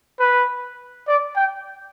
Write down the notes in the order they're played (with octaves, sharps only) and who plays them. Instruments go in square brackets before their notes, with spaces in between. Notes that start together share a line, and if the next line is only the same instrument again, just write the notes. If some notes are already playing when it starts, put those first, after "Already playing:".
[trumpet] B4
D5
G5